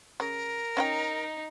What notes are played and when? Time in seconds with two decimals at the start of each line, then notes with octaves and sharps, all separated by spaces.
0.20 C#3 A#4
0.77 C#4 D#4 F5 G5